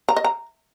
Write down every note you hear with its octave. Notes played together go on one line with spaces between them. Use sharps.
A#5
D#5
A#5